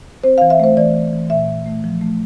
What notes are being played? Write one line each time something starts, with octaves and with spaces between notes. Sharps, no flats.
C4 C5
E3 F5
E5
A3 C5
E3 D5
E3
E3
A#2 E5
A#2
A3
F3
A3